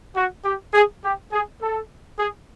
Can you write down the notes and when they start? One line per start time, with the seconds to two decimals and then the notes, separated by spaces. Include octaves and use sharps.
0.16 F#4
0.45 G4
0.74 G#4
1.03 G4
1.32 G#4
1.61 A4
2.19 G#4